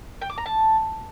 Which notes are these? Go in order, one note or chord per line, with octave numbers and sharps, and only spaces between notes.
G5
D6
A#5
A5